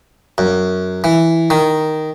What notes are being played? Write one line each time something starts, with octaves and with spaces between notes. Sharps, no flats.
F#2
E3
D#3